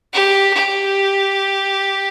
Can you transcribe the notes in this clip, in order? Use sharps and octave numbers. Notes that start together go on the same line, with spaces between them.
G4
G4